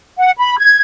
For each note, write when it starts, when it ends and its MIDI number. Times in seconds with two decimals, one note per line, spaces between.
0.19 0.31 78
0.38 0.57 83
0.59 0.81 92